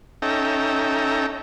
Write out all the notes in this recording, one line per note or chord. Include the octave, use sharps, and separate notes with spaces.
C#4 D#4 A4 E5 G5 A#5